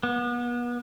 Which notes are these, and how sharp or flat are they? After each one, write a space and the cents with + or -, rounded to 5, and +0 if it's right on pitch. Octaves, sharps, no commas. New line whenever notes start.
B3 -35